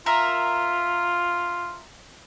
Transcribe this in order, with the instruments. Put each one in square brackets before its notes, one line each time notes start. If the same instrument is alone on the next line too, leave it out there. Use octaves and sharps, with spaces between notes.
[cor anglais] F4 [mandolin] A#4 E5